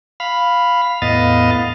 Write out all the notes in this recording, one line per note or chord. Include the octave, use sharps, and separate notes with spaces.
F5 B5
E2 A2 B3 D#5 F5 A6